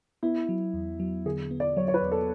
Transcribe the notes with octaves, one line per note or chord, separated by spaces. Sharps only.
B3 E4
F#3
E2
F#3
D3 G#4
B3
D5
F#3 C#5
C#5
B4
E2
A4